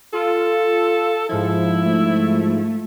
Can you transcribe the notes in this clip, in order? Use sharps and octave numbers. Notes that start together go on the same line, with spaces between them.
F4 A4
G#2 F3 E4
A3